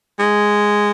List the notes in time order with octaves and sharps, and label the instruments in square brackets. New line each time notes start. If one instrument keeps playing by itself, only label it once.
[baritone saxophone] G#3